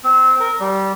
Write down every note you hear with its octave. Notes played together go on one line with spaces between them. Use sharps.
C4
A#4
G3